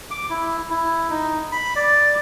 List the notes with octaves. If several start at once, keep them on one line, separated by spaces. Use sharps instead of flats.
D6
E4
E4
D#4
B5
D5